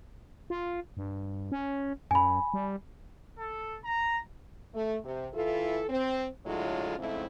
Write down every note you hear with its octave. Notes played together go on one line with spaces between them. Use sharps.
F4
G2
C#4
F#2 G#5 B5
G3
A4
A#5
A3
C3
E3 E4 F4 A4
C4
A2 D3 F#3 G#3 E4 F4
F2 G#2 C#3 A3 C4 E4